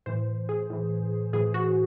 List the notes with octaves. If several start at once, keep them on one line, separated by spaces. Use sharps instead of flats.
A2 E3 C5
G#4
A2 E3
A2 E3 G#4
F#4